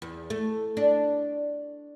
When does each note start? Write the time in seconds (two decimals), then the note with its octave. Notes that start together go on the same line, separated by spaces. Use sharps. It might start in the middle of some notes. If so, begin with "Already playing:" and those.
0.02 E2
0.30 A3
0.77 D4